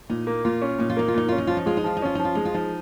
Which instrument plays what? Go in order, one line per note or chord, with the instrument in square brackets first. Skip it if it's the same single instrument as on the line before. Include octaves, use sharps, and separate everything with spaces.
[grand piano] A#2 [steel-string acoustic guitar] D#4
[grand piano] A#3
[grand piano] A#2 [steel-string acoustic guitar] F4
[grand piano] C#4
[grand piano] A#2 [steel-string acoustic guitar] D#4
[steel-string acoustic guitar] F4
[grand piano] A#3 [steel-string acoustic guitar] D#4
[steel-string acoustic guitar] F4
[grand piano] A#2 [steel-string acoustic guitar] D#4
[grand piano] C#4 [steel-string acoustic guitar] F4
[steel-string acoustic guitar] D#4
[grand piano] F3 [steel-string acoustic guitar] F4
[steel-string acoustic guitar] D#4
[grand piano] G#3 [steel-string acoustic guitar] F4
[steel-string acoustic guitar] D#4
[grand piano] F3 [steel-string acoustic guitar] F4
[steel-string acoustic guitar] D#4
[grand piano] C#4 [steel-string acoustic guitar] F4
[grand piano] F3 [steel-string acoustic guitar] D#4
[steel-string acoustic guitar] F4
[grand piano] G#3 [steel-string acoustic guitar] D#4
[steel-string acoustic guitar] F4
[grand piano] F3 [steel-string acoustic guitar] D#4